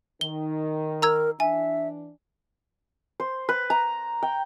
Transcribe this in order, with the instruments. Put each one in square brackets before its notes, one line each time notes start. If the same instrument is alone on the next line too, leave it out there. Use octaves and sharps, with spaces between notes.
[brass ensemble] D#3 [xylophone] G7
[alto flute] A#4 [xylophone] A#5 E6 G#6
[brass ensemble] E3 D4 [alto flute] E5 [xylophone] G#5
[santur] C5
B4
A#5
G5